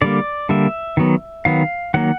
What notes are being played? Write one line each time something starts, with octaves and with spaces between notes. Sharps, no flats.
D3 G3 A#3 D5
D3 G3 A#3 E5
D#3 F#3 B3
D#3 F#3 B3 F5
D#3 F#3 A#3 F#5